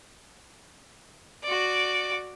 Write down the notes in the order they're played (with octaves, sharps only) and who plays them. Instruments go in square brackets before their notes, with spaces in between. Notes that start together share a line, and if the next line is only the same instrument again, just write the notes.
[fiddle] F#4 D5